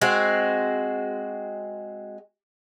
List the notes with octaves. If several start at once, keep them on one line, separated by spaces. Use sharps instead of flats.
G#3 C4 F#4